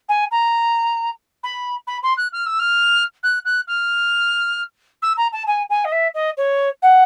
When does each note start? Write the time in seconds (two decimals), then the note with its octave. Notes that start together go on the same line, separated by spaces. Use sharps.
0.09 G#5
0.31 A#5
1.44 B5
1.87 B5
2.03 C6
2.17 F#6
2.33 F6
2.46 E6
2.60 F6
3.23 F#6
3.45 F#6
3.68 F6
5.02 E6
5.17 A#5
5.33 A5
5.47 G#5
5.70 G#5
5.85 D#5
5.92 E5
6.15 D#5
6.37 C#5
6.82 F#5